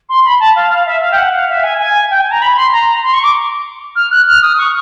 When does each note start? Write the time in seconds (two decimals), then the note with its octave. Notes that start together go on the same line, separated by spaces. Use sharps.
0.09 C6
0.24 B5
0.39 A5
0.55 F5
0.71 F5
0.86 E5
1.02 F5
1.12 G5
1.17 F#5
1.33 F5
1.49 E5
1.63 G#5
1.79 G#5
2.10 G5
2.20 G#5
2.31 A#5
2.42 B5
2.56 C6
2.72 A#5
3.03 C6
3.13 C#6
3.23 D6
3.95 F6
4.11 F#6
4.27 F6
4.42 D#6
4.58 C#6